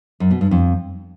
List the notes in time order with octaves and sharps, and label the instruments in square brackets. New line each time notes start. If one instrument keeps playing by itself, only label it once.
[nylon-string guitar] F#2
B2
G2
F2